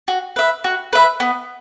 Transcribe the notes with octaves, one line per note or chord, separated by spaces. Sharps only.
F#4
B4 E5
F#4
B4 E5
B3